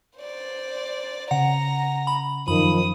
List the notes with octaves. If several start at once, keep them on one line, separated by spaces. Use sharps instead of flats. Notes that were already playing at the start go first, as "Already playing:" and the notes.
C5 D5
C#3 F#5 A#5
B5
F#2 D#3 F3 B5 D#6